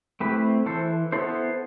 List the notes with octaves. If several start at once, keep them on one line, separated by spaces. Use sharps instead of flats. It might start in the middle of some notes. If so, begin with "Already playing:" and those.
A3 C4 E4 G4 B4
E3 A4 C5
B3 E4 A4 C5